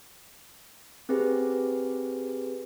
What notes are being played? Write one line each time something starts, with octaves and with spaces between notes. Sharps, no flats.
C4 G4 G#4 B4